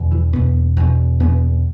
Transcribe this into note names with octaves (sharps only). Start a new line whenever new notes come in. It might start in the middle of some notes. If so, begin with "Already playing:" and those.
Already playing: E2 B2
E3
E2 B2 B3
E2 B2
E2 B2 B3